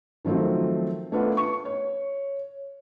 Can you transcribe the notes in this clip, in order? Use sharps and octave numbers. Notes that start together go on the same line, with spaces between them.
D#3 F3 F#3 A3 C4
A3 B3 D4 F4 B4 F#5
C#6
C#5